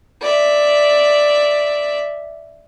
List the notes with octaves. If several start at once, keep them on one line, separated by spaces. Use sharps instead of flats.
D5 E5